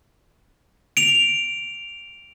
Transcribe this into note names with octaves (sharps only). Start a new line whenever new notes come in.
D7 F7